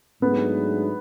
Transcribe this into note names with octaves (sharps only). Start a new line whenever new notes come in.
G#2 F#3 A3 B3 D4 G#4